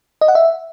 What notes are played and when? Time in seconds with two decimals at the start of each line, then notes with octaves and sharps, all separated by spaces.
0.21 D#5
0.28 F#5
0.35 E5